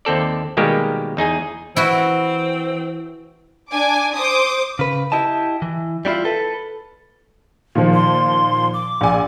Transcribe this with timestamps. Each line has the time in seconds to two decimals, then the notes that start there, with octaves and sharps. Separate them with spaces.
0.05 D#2 C4 A4 D5
0.57 B2 D#3 G3 G#3 A#3 G4
1.17 E2 D#4 G#4 G#5
1.76 E3 C4 E4 F#4
3.70 D4 G#5 D6
4.16 C5 D6 D#6
4.79 C#3 B4
5.12 E4 G4 D#5 A5
5.62 E3
6.05 G3 D4 E4 F4
6.25 A4 B4
7.75 A#2 D#3 F3
7.94 C6
8.74 D6
9.01 A#1 G#5